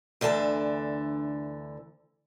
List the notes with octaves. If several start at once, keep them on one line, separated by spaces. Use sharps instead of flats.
D2 D3 E3 A4 A5